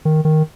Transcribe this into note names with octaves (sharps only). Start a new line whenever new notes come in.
D#3
D#3